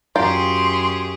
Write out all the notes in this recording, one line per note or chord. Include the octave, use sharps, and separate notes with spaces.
F#2 F4 G4 G#4 G5 A#5 C6